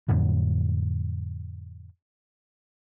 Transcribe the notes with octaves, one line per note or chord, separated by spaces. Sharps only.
F2 A2 D3 F#3